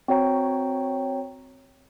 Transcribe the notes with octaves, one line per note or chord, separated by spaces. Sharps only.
C4 F#4 C#5 G5 A#5